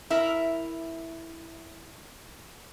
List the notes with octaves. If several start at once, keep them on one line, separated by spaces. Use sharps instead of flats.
E4 A#4 E5